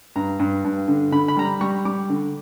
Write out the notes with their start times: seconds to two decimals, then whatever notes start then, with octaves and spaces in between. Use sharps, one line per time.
0.16 G2 A#5
0.40 G2
0.65 G2
0.88 D3
1.12 D3 B5
1.28 B5
1.37 G3 A#5
1.45 B5
1.61 G3 C#6
1.85 G3 D6
2.10 D3